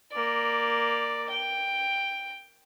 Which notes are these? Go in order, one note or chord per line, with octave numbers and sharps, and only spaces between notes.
A#3 D5
G5